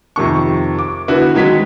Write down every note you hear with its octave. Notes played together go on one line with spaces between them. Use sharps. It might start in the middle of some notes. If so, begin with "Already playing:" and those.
F2 C3 D#3 C#6
D6
D3 B3 E4 F#4
D#3 F#3 G#3 C#4 B6